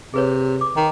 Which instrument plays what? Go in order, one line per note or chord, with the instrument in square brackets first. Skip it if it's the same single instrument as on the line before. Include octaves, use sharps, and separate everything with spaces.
[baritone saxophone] C3 [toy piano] G#4 B4 C#5
[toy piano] D6
[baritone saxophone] D#3